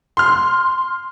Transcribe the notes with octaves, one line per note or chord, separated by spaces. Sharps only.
C6 F6